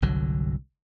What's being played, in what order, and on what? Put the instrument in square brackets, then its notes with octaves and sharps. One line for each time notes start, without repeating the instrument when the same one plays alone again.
[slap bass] G1 C2 D3 F#3